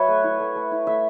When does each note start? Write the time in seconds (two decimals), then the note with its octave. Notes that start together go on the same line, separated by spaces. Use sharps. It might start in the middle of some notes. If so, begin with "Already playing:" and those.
Already playing: F#3 B4 C#5 E5
0.08 A3
0.24 E4
0.40 A3
0.55 A3
0.71 E4
0.87 A3 E5